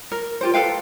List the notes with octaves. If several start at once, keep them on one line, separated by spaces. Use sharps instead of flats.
A#4
F4 G4 C5
A4 B4 F5 G5